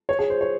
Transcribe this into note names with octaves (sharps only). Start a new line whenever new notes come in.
C#5
G#4
C5
C#5